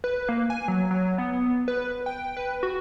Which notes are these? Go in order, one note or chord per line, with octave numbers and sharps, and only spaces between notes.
B4
A#3
G#5
F#3
F#3
B3
B4
G5
B4
F#4